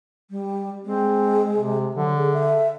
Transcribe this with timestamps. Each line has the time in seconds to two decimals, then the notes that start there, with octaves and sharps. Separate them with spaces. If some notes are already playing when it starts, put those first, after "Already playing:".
0.30 G3
0.85 G#3 C4
1.56 C3
1.95 D3 F#3
2.17 G#4
2.34 E5